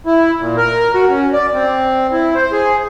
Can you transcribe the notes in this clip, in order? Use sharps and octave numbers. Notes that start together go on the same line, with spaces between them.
E4
A#2
A#4
F#4
C#4
D5
C4
E4
C5
G#4